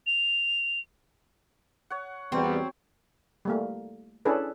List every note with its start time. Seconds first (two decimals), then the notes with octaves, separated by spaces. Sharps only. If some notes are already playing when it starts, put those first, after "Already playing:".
0.07 F7
1.90 C#5 F#5
2.32 E2 F#3 G3 B3 C4 G5
3.45 G3 A3 A#3
4.25 C#4 D4 E4 G#4 A4 B4